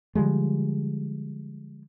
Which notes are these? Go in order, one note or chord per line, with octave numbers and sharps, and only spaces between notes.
D3 F3 G3 G#3